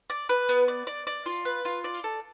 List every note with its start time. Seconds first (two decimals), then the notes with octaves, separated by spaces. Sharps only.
0.10 D5
0.29 B4
0.49 B3
0.68 D5
0.87 D5
1.07 D5
1.26 F4
1.45 B4
1.65 F4
1.84 D5
2.04 A4